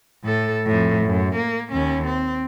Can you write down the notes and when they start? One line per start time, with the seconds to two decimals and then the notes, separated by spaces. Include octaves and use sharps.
0.23 A2 A4
0.66 F2 A2
1.06 F#2
1.36 A#3
1.72 D#2 C#4
2.06 C4